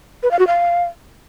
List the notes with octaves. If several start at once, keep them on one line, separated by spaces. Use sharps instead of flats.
B4
F5
F#4
F5